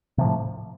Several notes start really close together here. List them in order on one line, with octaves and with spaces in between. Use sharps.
C3 F3 A2